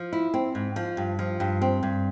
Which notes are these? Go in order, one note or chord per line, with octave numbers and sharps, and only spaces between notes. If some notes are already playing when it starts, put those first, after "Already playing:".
Already playing: F3
E4
C4
G#2
F3
G2
F3
G2
C4
G2